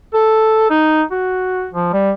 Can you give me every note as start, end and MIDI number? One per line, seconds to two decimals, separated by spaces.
0.14 0.70 69
0.70 1.03 63
1.11 1.67 66
1.73 1.91 53
1.93 2.11 55